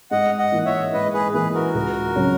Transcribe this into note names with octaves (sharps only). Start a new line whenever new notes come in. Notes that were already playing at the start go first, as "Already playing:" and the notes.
G#2 D#5 F#5
D#5 F#5
E3 A#3 E4
C#5 E5
G#2 B4 D#5
G#4 B4
E3 A#3 E4 G#4 B4
F#4 A#4
C#2
C#3 F#3 C#4